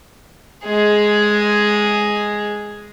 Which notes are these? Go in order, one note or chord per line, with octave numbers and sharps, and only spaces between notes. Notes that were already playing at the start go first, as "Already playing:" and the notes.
G#3 G#4